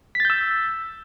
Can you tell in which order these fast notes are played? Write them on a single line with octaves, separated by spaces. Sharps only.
B6 A6 G6 E6